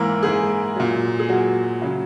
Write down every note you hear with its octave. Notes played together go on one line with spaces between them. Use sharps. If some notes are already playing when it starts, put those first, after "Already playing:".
Already playing: G#2 E3 A#3 A#4
G#2 E3 G#4
A#2 F#3
G#4
A#2 F#3 F#4
C#3 F#3